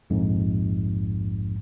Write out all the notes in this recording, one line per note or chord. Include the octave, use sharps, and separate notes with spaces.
A#1 F2 G#2